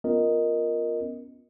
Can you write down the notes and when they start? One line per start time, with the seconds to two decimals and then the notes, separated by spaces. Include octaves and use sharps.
0.04 B3 C#4 F4 A#4 D#5